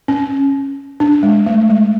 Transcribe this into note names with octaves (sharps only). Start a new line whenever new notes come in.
C#4
D4
G#3
A3
G#3